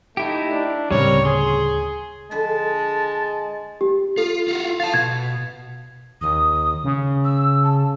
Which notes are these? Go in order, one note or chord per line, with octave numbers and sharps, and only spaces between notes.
A3 D#4 E4 G4
D4
D2 A2 C#3 G3 C4 A#4 C#5
G#4 C6
D3 F3 G#3 B4 A5
G4
F4 A4
F4 F#4
F5 A5 A6
B2 G#6
D#2 D#6
C#3
E6
A5